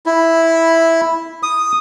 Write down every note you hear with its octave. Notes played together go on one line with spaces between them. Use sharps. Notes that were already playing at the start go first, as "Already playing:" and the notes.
E4
D#6